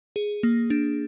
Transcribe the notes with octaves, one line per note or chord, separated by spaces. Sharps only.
G#4
A#3
D4